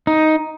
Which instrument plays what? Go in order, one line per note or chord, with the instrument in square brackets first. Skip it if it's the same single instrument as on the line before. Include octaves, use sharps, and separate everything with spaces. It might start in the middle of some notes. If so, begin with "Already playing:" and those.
[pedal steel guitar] D#4